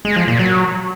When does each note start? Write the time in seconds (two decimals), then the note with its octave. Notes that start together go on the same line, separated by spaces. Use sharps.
0.05 G#3
0.16 F3
0.28 A#2
0.39 F#3